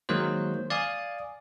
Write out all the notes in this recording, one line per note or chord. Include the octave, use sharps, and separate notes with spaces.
D#3 F#3 G#3 A#3 C5
D5 F5 G#5 D#6